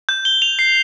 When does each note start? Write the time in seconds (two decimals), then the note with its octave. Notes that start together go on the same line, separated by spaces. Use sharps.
0.09 G6
0.25 G7
0.42 F7
0.59 C7